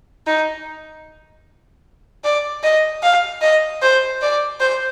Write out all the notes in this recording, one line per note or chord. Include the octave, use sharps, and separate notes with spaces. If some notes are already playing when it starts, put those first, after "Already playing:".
D#4
D5
D#5
F5
D#5
C5
D5
C5